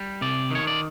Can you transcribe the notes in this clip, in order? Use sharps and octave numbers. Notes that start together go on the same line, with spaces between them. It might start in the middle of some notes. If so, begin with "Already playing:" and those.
Already playing: G3
C3 D5
D#3 C#5
D5